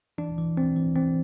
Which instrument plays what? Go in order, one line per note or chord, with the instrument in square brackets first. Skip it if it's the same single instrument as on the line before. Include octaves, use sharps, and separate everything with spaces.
[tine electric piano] E3 D4
E3
E3 C4
E3
E3 C4